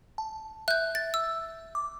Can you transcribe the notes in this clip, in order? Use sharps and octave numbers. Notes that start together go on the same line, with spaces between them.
A5
E5 F#6 G6
A6
E6
D6